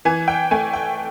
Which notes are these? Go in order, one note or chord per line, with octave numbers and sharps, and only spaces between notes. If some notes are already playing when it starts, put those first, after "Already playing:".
E3 G#5
G5
A3 G#5
G5